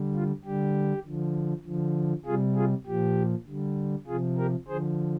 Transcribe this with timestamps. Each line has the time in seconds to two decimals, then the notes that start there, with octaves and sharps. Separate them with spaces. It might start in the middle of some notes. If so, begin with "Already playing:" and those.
Already playing: D3 G3
0.15 F4
0.45 D3 G3 G4
1.05 D3 F3
1.65 D3 F3
2.26 C3 G3 F4 G#4
2.56 F4 G#4
2.86 A#2 F3 G4
3.47 D3 G3
4.07 C3 F3 F4 G#4
4.37 G4 A#4
4.68 D3 F3 G#4 C5